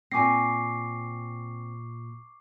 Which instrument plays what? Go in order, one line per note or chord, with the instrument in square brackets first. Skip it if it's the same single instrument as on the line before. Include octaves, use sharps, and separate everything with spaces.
[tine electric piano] A#2 A#6 [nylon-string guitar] C4 G#5 [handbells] C#6 D6 C7